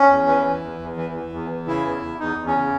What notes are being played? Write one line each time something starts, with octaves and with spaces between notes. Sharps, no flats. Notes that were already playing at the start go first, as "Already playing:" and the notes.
Already playing: C#4
E2
E3
E3
E2
E2
E3
E3
E2
E3
C#3 E4
E2
E2
E2 D#4
E2
C#4
C#3